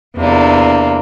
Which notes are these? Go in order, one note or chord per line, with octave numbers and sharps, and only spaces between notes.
E2 C3 A#3 D4